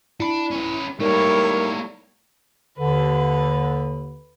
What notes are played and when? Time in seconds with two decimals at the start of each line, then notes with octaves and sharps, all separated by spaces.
0.20 D4 E4 B5
0.51 C#4 B4
1.00 G3 A3 A#3 D#4 E4 A#4 C#5
2.79 D#2 D3 B4